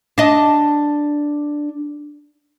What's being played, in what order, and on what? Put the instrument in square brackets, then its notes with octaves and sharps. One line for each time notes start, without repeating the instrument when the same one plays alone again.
[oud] D4 D#5